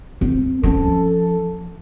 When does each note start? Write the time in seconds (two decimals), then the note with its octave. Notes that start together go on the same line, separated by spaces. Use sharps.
0.21 C4
0.63 F3 C#4 A4